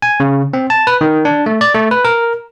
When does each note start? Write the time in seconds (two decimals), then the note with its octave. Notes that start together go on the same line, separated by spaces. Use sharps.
0.02 G#5
0.20 C#3
0.53 C4
0.70 A5
0.87 B4
1.01 D#3
1.25 D4
1.46 A3
1.61 D5
1.74 A3
1.91 B4
2.05 A#4